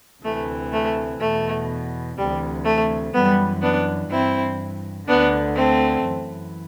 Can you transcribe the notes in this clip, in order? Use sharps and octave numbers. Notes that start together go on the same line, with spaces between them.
D2 C3 E3 A3
A3
E2 B2 A3
D2 C3 E3 G3
A3
F#2 E3 G3 B3
B3 D4
G2 E3 C4 E4
D2 D3 B3 D4
A3 C4
F#2 E3